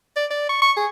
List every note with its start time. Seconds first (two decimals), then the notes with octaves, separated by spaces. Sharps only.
0.16 D5
0.31 D5
0.49 C#6
0.62 C#6
0.77 G#4